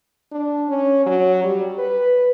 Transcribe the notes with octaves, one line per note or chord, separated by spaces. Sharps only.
D4
C#4
F#3
G3
B4